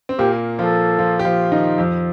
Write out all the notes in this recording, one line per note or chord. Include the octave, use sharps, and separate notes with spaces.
C4
A#2 A#3 G4
F3 F4 A4
F3 F4
G4
F3 F4
D#3 D#4
F2 F3